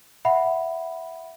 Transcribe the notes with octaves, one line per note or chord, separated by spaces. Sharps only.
E5 F#5 B5